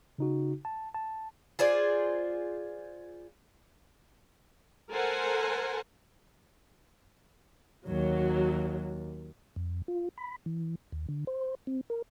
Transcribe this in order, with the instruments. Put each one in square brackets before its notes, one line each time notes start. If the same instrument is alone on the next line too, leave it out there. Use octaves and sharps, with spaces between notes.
[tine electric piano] C#3 D#4 F#4
A5
A5
[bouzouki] F4 G#4 C5 D5
[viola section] A4 A#4 C5 F#5 G#5
[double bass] D#2 [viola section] F#3
[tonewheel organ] F2
F4
B5
E3
D#2
D3
C5
C4
A#4